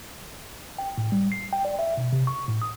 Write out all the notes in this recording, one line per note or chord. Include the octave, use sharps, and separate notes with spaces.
G5
A2
G3
C7
G5
D5
E5
B2
C3
C#6
A2
D#6